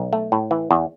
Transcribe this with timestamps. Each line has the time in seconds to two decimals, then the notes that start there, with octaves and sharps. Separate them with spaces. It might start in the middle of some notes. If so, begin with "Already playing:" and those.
Already playing: B1
0.13 A3
0.32 A2
0.51 E3
0.71 E2